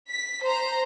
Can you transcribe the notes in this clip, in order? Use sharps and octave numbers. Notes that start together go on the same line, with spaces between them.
B6
C5 A#5